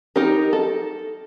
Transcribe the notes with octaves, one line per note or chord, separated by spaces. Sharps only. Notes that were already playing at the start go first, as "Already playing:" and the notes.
D#4 G4 A#4
A4